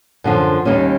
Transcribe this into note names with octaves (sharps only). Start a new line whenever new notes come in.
F#2 D3 F3
D#2 D#3 G3 A#3 C#4